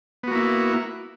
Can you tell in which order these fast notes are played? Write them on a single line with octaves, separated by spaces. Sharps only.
B3 F#4 A#3 E4